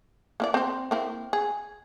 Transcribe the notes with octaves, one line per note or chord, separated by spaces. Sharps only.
A#3 E4 D5
C4 C5
A#3 C4 E4
G#4